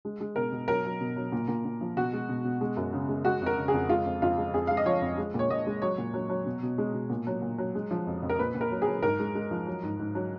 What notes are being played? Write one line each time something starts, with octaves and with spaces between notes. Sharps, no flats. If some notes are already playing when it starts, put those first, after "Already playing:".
G#3
G#3
B2 A#4
B2
F#3 A#4
F#3
B2
F#3
A#2
A#2
A#2
F3
B2 F#4
G#3
B2
B2
G#3
F#2
C#3
G#3
G#3 F#4
F2
A#4
C#3
G#4
F2
G#3 F4
F2
F2 F4
G#3
F2 G#4
G#3 F5
D#5
F3 C#5
F2
G#3
A#2 C#5
A#2 D#5
G#3
F#3 C#5
A#2
F#3
F#3
B2
B2
G#3
B2
A#2
F#3
A#2
F#3
G#3
F3
F2
F2
A#4
A#2 B4
A#2
A#4
F#3
F#3 G#4
G#2 A#4
G#3
G#3
F3
F#3
G#2
G#2
F#3